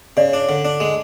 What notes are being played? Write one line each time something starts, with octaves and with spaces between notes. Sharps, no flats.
C#3 D5
D4
D3
D4
G#3